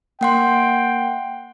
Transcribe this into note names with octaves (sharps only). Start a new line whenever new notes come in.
A#3 F#5 G5 C6